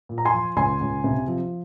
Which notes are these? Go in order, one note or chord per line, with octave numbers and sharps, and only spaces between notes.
A#2
A#5
G#5 C6
F3
C#2 G#5 C6
C#2
C3
F3